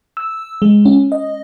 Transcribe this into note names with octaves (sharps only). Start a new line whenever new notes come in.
E6
G#3
C#4
D#5